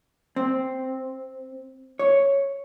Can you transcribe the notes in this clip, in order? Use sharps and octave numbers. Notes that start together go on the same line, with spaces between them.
C4
C#5